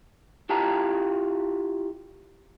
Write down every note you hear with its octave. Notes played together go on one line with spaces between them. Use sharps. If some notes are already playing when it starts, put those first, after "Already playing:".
E4 F4 G4 G5 A5 A#5